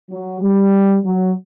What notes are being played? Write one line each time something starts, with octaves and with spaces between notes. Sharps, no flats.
F#3
G3
F#3